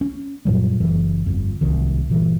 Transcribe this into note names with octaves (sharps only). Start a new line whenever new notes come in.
C#4
F#2 A#2 F#3 G3
F#1 F#2 E3
G1 F2
D1 C2 D#3
G1 A#2 E3